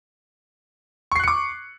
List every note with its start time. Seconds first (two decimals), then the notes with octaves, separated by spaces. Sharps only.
1.12 C#6
1.16 C7
1.20 F#6
1.24 C#7
1.28 D6